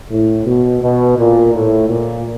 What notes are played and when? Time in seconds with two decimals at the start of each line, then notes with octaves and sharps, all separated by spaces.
0.11 A2
0.46 B2
0.82 B2
1.18 A#2
1.54 A2
1.89 A#2